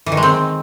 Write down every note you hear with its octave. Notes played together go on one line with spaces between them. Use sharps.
E3
D#3
G#3
C4